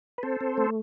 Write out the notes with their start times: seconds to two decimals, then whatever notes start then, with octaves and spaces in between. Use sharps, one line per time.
0.18 B4
0.23 C4 A4 C5
0.41 C4
0.58 A3